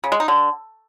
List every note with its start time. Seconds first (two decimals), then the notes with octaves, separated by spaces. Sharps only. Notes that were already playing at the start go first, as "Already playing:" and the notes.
0.04 C#3
0.12 G#3
0.20 D#4
0.28 D3